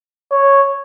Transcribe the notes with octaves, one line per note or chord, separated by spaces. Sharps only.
C#5